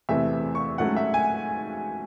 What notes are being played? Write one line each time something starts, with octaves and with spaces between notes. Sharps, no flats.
E2 C3 E3 A3 E5
C#6
G#2 F#3 A3 C#4 F#5
E5
G#5